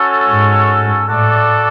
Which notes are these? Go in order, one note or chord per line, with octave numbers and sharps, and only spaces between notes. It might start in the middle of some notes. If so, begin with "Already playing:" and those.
Already playing: C#4 F#4 A4 C#5
G#2
A2 F#4 A4 D5